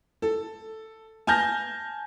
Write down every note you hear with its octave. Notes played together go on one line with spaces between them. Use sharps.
A4
G#5 A5 F6 G6 A#6